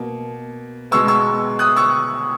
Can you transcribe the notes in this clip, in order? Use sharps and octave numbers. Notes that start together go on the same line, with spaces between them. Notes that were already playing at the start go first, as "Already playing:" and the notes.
Already playing: B2 A#3
B2 G#3 B3 C#6 E6
C#6 E6
D#6 F#6
C#6 E6